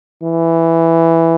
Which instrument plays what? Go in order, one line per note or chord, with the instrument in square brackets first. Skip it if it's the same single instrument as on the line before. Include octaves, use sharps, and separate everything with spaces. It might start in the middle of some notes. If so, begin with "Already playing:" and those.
[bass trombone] E3